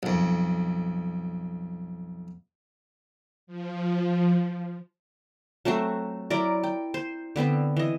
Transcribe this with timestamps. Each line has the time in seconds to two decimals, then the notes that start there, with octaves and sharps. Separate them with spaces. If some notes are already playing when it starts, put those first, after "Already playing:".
0.03 B1 F2
3.47 F3
5.65 F#3 A3 C4 F#4
6.30 F#3 E4 A#4 D5
6.63 G5
6.94 C5
7.36 D3 B3 C4 B4
7.77 E3 D#5